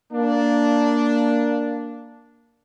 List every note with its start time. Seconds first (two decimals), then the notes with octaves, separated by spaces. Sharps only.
0.13 A#3 D4